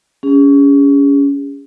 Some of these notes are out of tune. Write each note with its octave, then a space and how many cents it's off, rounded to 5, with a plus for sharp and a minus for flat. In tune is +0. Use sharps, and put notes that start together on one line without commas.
C#4 +25 G#4 -30